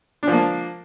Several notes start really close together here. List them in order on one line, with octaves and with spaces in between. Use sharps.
D4 F3 A#3